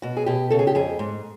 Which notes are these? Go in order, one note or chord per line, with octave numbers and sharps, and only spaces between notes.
B2 F#4
G#4
B2 G4
C#3 A4
G#4
G4
F2 G#4
G#2